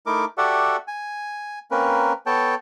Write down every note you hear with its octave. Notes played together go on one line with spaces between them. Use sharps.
A3 D#4 E4 A#4 D6
F#4 G4 A4 D5 E5 F#5
G#5
A#3 C4 C#4 A#4 B4
B3 A4 C#5 G5 A5